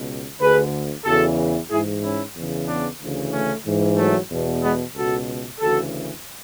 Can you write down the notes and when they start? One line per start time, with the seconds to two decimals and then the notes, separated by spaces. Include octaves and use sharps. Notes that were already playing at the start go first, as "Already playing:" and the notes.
Already playing: C#2 B2
0.40 D2 D3 G#4 B4
1.05 E2 C#3 E3 F#4 A4
1.70 G#2 E3 E4 G#4
2.03 C#4 E4
2.36 E2 C#3 E3
2.67 B3 D4
3.00 D2 C#3 E3
3.33 A3 C#4
3.66 G#2 E3
3.97 F#3 A3
4.31 E2 B2
4.62 G#3 B3
4.95 C#2 B2 F#4 A4
5.60 D2 C#3 E3 F#4 A4